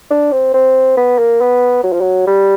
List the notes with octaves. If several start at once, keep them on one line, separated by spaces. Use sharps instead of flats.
D4
C4
C4
B3
A#3
B3
F#3
F3
F#3
G3